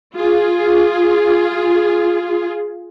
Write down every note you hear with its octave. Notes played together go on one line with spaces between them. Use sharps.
F4 G#4